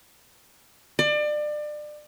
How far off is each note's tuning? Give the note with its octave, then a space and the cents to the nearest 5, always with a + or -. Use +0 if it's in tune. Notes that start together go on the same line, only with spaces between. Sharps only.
D5 +30